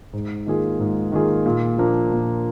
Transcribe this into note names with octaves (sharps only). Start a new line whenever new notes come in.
G#2
D#3 A#3 F4 G#4
G#2
D#3 A#3 F4 G#4
A#2
F3 A#3 D4
A#2